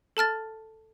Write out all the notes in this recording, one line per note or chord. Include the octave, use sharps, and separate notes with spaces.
A4 A5 F6 A6